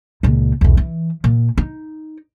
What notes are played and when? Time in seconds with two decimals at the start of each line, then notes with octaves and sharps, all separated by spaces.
0.23 C#2 A#2
0.61 B1 E2
0.77 E3
1.24 A#2
1.58 D#4